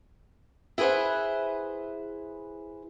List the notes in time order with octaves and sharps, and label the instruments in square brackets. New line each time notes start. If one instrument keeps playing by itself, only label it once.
[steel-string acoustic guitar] E4 G#4 B4 C5 F#5